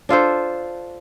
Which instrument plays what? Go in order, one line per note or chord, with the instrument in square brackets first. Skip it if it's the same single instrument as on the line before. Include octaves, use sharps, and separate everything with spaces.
[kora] D4 F4 A4 C5